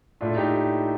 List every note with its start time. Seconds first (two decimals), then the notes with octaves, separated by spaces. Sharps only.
0.21 A2 A3 D4 F4
0.36 D#4 G4